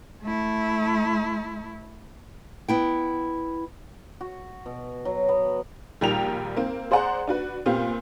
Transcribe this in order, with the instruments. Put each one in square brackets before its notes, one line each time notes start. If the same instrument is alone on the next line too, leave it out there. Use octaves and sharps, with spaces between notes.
[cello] A3 E4
[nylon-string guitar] B3 E4 G5
[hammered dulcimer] F#4
B2
F#3
B3
[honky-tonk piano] A#1 D#2 G3 A#4 G5 F7
A#3 C4
G#4 C5 D5 F#5 A#5
D4 F#4 B4
A#2 B3 C4 G4 F5